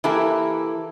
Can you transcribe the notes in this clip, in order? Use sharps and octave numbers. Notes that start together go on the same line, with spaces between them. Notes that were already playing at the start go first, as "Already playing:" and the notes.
E3 A#3 E4 G4 A4